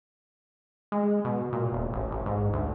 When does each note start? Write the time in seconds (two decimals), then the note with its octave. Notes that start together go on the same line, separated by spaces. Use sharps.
0.92 G#3
1.25 B2
1.52 A#2
1.72 E1
1.93 A1
2.11 A1
2.26 G#2
2.53 D2